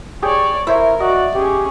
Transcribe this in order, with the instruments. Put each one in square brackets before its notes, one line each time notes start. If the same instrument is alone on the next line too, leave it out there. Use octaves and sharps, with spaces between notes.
[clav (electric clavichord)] G4 G#4 G5 [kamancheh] C#5 D5
[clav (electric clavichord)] E4 C5 C#5 [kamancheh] A#4 [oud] E5
[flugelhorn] F#4 [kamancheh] D5 [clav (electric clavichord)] D#5
[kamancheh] C#4 G#4 [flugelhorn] G4